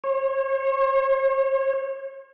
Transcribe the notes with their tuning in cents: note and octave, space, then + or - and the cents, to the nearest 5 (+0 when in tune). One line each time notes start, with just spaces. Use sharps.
C#5 -40